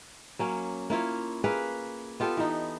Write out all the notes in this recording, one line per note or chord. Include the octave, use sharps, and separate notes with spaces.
F#3 A#3 C#4
A#3 E4 F4 C#5
A#3 G#4 B4 F5
B3 F4 G4 A4
E3 D#4